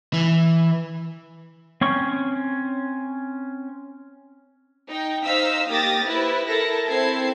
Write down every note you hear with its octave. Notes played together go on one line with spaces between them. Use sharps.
E3
C4 C#4 C#6
D#4 G5
D#4 C5 F5 E6 B6
A#3 G4 D#6 A6 A#6
E4 B4 C5
E4 A4 A#4 A5 A#6
C4 E4 A4 C5 G#6 C7